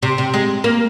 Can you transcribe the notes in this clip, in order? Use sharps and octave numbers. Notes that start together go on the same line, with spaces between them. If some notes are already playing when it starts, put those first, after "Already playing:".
C3
C3
G#3
A#3